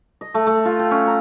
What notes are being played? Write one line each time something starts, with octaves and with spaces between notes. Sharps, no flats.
D#5
A3
A3
F4
G5
C#4
A#5